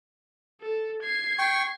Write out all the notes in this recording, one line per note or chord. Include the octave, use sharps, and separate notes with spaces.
A4
G#6 C7
G5 C#6